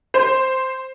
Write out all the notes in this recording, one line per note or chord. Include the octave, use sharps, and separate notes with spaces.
C5